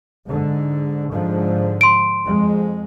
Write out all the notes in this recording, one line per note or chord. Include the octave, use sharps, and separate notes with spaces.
G#2 D3
G#2 D3 F3
C6 D7
F2 G#3